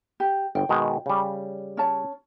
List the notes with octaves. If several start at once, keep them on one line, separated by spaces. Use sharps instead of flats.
G4
G1 G5
B2 D#3 G#3
C#3 G3
C#4 C#5 A5